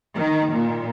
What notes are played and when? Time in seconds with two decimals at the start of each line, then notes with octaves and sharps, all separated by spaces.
0.15 D#3
0.52 A#2